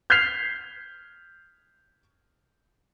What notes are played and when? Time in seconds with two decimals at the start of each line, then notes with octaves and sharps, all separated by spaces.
0.10 F6 G6 G#6 B6 C7 F7